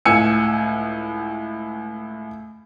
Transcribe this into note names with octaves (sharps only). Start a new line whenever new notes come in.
C#2 A2 G#5 E6 C#7